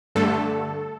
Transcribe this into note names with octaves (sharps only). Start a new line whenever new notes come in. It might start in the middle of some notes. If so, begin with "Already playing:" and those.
G2 D3 A3 A4